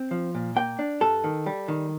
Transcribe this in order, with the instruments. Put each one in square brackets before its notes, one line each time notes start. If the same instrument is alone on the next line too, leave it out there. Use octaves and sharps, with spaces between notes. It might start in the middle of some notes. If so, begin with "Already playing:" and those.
Already playing: [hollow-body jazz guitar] C4
F3
A#2
A#3 G5
D4
G2 A4
D#3
G3
D#3